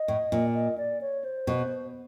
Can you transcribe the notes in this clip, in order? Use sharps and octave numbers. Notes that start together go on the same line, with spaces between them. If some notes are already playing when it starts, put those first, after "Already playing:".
Already playing: D#5
A2
A#2
D#5
D5
C#5
C5
B2